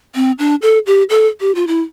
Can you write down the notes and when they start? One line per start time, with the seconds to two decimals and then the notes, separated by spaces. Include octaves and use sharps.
0.15 C4
0.39 D4
0.62 A4
0.86 G4
1.10 A4
1.40 G4
1.55 F4
1.67 E4